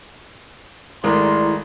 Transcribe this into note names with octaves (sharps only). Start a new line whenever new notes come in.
G#1 G#3 A3 E4 A#4 D5 C6